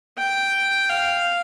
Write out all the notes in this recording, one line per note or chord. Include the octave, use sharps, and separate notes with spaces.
G5
F5